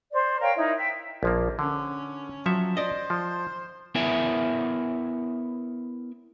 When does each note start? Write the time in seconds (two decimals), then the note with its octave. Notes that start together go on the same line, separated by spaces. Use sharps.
0.13 C5 D5
0.41 A#4 C#5 F5 G5
0.56 D#4 E4 A#4
0.77 E5 G5
1.23 A#1 F3 A#3
1.59 D3 C#4
2.46 F3 F#3 C#5 E5
2.77 C5 D5 D#5
3.10 F3
3.95 B3 E4 A#4 C#5 E5 G#5